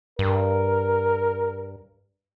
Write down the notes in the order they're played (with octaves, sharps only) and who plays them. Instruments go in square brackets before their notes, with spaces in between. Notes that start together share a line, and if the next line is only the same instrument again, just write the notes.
[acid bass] G2 [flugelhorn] A#4